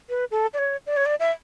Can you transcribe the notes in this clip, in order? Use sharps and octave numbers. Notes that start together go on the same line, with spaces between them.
B4
A4
D5
C#5
D5
C#5
D5
E5